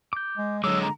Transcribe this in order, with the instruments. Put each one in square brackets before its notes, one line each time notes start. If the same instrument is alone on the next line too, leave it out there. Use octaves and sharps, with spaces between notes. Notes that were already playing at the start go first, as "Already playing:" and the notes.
[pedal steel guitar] D6 G6
[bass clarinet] G#3
[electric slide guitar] D3 G#3 [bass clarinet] F#3 [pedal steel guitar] D#5 D6 [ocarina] E6
[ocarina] A#5